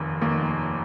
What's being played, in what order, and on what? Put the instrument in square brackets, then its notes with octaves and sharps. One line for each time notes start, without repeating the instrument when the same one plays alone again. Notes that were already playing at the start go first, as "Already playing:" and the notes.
Already playing: [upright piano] F1 D#2 D#3 A#3
F1 D#2 D#3 A#3